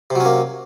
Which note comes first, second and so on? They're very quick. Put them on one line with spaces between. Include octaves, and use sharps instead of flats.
C3 F#3 C#4 A#3